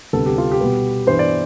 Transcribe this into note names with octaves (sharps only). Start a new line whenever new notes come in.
D2 C3 G3 B3 A4
G4
F4
G4
B2 G3 B3
G2 E3 B3 C5
D5